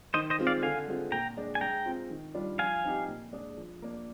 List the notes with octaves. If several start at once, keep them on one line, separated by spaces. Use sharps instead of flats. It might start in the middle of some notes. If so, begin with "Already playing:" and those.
D#3 C5 D#5
C5 D#5
G#3 C4 F4
D5 F5
D3 F5 G#5
G#3 C4 F4
A#2 G5 A#5
G#3 D4
G#5
G#3 G5 A#5
C4 F4
D#3
G3 D4 F4
F3 F5 G#5
C4 D#4 G4
A#2
G#3 D4 G#4
F3
A#3 D4